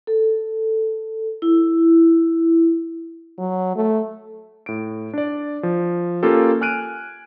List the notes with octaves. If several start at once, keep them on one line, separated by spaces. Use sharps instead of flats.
A4
E4
F#3
A3
A2 D7
D4 D5
F3
A#3 C#4 F4 G4 A4
G#5 F6 F#6 D7 D#7